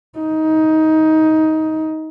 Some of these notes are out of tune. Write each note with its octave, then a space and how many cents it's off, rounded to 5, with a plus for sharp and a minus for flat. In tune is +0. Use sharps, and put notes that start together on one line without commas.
D#4 +15